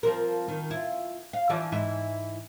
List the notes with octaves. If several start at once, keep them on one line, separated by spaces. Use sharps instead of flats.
F3 C4 A#4
D#3
E4 F4
F5
E3 F3 D5
G#2 E3 E4